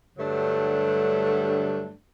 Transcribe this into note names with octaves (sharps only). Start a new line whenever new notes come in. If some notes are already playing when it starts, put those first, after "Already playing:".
G2 D3 F#3 G3 A3 D4